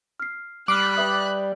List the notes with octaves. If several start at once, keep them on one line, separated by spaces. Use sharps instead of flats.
F6 C7
G3 B5 D6 F6 F#6 C7 D7
B4 E5 D#6